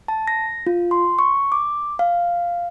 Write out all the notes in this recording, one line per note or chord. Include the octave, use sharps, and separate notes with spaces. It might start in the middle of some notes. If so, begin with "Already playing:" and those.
A5
A#6
F4
C6
C#6
D6
F5